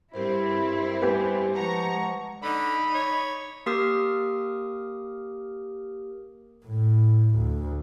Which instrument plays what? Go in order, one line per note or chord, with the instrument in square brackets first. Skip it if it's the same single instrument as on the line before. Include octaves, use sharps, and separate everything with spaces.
[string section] G2 C4 [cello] E4 [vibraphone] G4 A#4 C5
[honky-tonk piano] B3 G4 [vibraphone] G#5
[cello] F3 G#3 [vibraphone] F#5 A5 [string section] A#5 C#6
[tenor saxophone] D3 [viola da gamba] D#4 [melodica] B5
[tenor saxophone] C#5
[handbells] A#3 G4 A#4 D#6 F6
[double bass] A2
D2